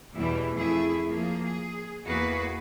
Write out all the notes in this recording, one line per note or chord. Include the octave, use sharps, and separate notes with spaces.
E2 B2 E3 G3 E4
F2 A3 E4 G#4
F3 A#3 G#4
G#4
E2 A#3 F#4 G#4 B4